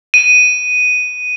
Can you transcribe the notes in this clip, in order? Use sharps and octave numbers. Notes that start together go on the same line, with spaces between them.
D#7